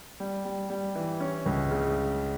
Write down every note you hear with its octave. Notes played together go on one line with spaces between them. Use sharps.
G3
G3
G3
E3
C#4
C#2
C#3